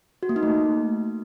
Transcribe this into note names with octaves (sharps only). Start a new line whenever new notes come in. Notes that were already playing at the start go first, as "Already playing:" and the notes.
F#4
A#3
D#4
A3